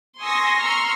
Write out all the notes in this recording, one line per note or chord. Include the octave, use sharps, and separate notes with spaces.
G#5 C6 C#6 D#6 E6 A#6
A#5 C6 C#6 E6 F6